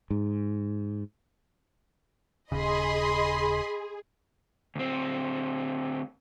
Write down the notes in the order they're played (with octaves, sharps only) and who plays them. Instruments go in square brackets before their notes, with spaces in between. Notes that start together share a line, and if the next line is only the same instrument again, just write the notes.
[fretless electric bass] G#2
[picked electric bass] D#1 C#3 [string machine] G#4 [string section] D#5 B5 C6
[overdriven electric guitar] D2 C4